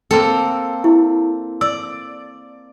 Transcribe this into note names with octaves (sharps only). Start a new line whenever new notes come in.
A#3 C4 A4
E4
D5 E6